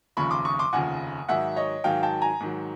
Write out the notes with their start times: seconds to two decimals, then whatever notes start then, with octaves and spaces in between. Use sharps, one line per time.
0.17 F1 D#2 C#3 F3 B5 C#6
0.31 C6 D6
0.45 C#6 D#6
0.59 C6 D6
0.73 F1 D#2 C#3 F3 F#5 G#5
1.29 G#2 D#3 F#3 E5 F#5
1.56 C#5 D#5
1.84 G#2 D#3 F#3 F5 G5
2.03 G5 A5
2.21 G#5 A#5
2.40 G#2 D#3 F#3